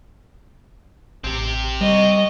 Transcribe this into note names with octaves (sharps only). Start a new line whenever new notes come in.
A1 C4 G4
G3 D#5 C#6